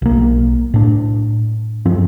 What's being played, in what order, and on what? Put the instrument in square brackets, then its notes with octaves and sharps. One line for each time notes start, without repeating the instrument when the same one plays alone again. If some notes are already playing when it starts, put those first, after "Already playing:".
[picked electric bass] B1 A#3
A2 D4
G2 F3 C4